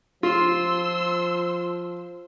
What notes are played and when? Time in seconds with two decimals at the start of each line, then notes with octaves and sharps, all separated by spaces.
0.23 F3 F4 C6 E6